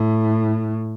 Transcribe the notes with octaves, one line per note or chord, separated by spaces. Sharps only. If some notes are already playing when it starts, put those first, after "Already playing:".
Already playing: A2